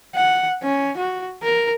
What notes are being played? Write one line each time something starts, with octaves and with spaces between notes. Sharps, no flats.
F#5
C#4
F#4
A#4